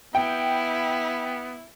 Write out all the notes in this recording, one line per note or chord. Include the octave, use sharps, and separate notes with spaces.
B3 E4 G5